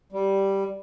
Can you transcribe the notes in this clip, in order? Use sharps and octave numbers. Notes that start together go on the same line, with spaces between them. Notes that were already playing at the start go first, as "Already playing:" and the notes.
G3